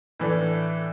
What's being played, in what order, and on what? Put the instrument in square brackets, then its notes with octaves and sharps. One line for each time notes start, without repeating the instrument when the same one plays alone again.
[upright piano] A2 E3 A3 D4